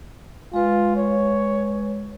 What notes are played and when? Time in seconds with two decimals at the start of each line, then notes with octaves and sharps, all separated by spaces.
0.54 G#3 F4 B4
0.96 C#5